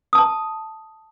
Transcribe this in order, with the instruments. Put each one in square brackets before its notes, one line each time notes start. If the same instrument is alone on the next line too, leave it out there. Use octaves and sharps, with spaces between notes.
[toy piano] A5 D#6